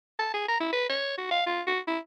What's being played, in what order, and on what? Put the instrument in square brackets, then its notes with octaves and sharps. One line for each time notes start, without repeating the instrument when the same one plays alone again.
[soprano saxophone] A5
G#4
A#5
E4
B4
C#5
F#4
F5
F4
F#4
E4